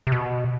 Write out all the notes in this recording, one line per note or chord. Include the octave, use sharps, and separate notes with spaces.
C3
B2